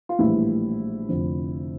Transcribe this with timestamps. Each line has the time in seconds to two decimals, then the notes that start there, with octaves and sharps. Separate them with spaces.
0.09 F4
0.19 A#1 A2 E3 G3 E4
1.09 F1 F2 D3